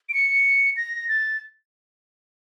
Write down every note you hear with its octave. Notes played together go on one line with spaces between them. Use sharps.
D7
C#7
A#6
A6